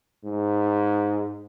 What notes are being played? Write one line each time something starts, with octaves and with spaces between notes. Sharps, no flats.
G#2